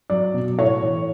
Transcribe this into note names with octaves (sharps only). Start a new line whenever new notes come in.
F#3 D5
B2
A2 C#5
E3